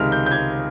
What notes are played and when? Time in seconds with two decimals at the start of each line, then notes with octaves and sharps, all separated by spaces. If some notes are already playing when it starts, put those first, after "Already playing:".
Already playing: C#2 C3 D#3 G#3 F6
0.12 G6
0.26 G6
0.32 G#6